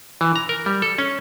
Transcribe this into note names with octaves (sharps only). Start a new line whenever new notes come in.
E3
A#5
A#4
G3
A4
C#4